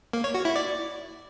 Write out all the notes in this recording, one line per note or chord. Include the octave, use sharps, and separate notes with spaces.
A#3
C#5
F#4
E4
D5